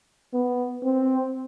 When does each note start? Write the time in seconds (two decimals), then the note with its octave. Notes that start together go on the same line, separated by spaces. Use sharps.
0.33 B3
0.83 C4